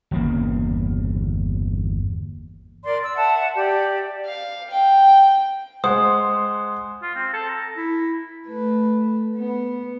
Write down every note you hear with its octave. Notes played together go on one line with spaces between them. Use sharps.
G1 E2 C#3 A#3
A#4 D5 C6
E6
E5 F#5 A5
G4 D5
F5
G5
G#3 C5 F#5 D#6
F4
C4
A4
A#5
E4
A3 B4
B3